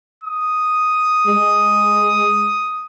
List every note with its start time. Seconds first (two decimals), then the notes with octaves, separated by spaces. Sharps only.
0.24 D#6
1.26 G#3